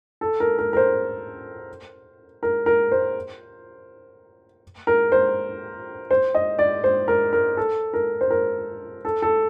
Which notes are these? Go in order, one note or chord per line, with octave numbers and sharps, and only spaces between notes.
A4
A#4
A#4
A#4
C5
A#4
A#4
C5
A#4
C5
C5
D#5
D5
C5
A#4
A#4
A4
A#4
C5
A#4
A4
A4